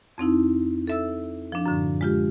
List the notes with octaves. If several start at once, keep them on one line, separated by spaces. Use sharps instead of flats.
F2 C4 D#4 E4
A4 E5 E6
F3 D4
F#2 A2 D3
G#3 F4 G4